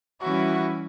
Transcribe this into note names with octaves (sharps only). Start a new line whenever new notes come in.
E3 G3 C#4 E4 F#4